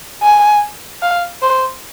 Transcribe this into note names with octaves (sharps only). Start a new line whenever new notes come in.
G#5
F5
C5